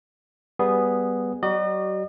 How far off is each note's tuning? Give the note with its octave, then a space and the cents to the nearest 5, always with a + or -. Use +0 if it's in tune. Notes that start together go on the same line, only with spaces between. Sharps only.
G3 +0 B3 +0 G#4 -5
F#3 +40 F#4 +45 D#5 -40